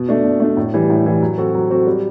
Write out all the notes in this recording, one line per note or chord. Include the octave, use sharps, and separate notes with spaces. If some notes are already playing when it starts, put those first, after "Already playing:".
Already playing: B2
A3 D4
B2
A3 D4
A2
E3 G3
A2
E3 G3
F#3
C4 F#4 A4
F#3
C4 F#4 A4
G3